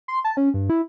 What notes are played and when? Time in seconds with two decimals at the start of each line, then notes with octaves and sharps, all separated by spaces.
0.08 C6
0.24 A5
0.37 C#4
0.54 G2
0.70 E4